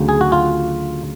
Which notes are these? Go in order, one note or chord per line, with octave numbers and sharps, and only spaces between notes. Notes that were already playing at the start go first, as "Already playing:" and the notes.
Already playing: D2 C#3 F#3
G#4
F#4
F4